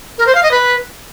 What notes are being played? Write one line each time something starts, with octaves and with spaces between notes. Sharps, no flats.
A#4
C5
F5
D#5
B4